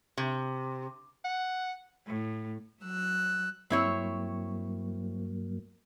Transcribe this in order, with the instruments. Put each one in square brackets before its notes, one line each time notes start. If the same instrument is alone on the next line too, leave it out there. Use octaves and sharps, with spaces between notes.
[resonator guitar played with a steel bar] C3
[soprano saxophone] F#5
[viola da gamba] A2
[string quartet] F#3 E6 F#6
[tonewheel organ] G2 F#3 A#3 [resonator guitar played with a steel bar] C4 E4 C#5